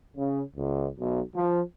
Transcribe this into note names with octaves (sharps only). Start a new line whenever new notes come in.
C#3
C#2
B1
F3